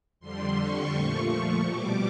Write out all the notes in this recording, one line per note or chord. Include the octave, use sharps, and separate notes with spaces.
F2 D3 G3 C6
C#6
A#2 F3 A3 C#6
C#6
B2 G3 D6